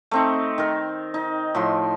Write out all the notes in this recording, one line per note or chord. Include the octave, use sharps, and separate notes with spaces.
A3 C4 D#4
D#3 A#4
D#4
A2 F3 C6